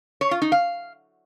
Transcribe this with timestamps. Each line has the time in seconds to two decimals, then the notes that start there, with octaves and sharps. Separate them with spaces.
0.21 C#5
0.31 F4
0.42 D#4
0.52 F5